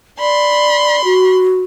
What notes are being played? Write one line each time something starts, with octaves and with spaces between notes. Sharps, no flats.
D5 B5 C6
F#4